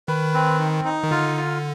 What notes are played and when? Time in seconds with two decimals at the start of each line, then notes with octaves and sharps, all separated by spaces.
0.08 D#3 B4
0.34 C4
0.59 D#4
0.85 D#4
1.03 D#3
1.11 D3 F4
1.37 F4